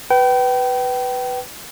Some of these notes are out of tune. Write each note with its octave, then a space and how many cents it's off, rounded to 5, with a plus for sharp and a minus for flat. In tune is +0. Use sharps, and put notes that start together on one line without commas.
B4 +5 G5 -30